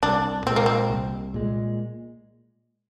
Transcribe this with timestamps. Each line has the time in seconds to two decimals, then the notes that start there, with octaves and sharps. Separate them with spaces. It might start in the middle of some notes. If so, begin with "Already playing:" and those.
0.03 C2 D4
0.46 A#2 G#3 C4
0.56 A#3
0.66 C4
0.90 C2
1.34 A#2 G#3